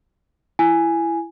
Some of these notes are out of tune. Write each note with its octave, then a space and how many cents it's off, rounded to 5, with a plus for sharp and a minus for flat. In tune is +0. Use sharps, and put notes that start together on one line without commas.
E4 +20 G#5 +0